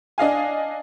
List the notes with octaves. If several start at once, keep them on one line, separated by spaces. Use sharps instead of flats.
D4 D#5 F5 G#5